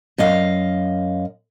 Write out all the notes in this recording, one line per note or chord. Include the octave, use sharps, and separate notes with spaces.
F#2 D#5 F5